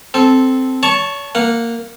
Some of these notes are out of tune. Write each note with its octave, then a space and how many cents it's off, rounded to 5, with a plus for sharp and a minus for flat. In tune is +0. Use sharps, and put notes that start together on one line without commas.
C4 -5 A4 -10
C#5 +35 A5 +0 C#6 +0
A#3 -10 F#5 -20